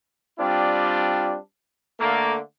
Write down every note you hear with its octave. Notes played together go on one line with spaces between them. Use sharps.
G3 C4 D4 F4
D3 A3 A#3